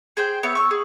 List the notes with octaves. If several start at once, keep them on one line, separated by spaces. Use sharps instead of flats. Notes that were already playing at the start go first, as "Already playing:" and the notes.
G#4 C5 G5
B3 C#5 E5
C#6 E6
G#4